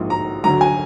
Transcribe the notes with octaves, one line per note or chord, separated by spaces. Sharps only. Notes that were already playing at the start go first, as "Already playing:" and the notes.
Already playing: A#1 G#2 F3 A#3
A#5
D2 D3 F#3 A#5
G#5